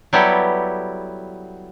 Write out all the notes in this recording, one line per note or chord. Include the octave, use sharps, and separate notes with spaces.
F#3 G3 B3 E4 G4 A4